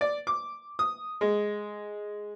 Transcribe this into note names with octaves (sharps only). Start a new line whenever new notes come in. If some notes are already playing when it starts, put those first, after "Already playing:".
D5
D6
D#6
G#3